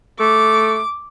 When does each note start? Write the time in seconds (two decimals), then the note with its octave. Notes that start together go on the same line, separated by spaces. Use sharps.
0.20 A3 D6